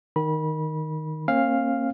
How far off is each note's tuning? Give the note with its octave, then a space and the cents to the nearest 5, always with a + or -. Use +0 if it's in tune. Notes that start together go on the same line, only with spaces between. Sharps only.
D#3 +0 B5 -25
A#3 +0 C#4 -40 F5 +0